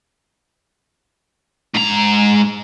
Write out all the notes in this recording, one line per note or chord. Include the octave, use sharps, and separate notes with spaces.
G#2 A#5